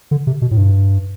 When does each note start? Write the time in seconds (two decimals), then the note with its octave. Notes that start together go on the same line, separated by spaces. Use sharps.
0.11 D3
0.27 C3
0.42 B2
0.51 A2
0.57 G2